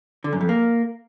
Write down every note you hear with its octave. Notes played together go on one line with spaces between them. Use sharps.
D3
F#2
F2
A#3